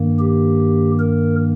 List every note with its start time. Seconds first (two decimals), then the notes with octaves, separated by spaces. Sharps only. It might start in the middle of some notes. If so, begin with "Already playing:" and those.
Already playing: G2 D#3 A#3
0.19 G4
0.99 A#4